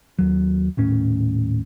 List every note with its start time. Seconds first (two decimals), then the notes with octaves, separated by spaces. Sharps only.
0.19 D#2 F#3
0.77 D#1 A2 C#4